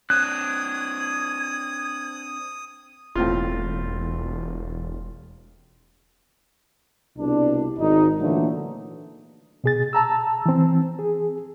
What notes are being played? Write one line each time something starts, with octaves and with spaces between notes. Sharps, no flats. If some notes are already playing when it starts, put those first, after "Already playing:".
C4 D4 D#6 F#6 G#6
E1 A2 C4 F4
C2 B2 D4
G#1 D#4
A#2 D3 E3 F#3 A3 A#3
B2 G#4 A6
A5 A#5 E6
E3 C4
G#4